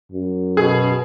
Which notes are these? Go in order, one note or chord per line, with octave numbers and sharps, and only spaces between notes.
F#2
B2 G#4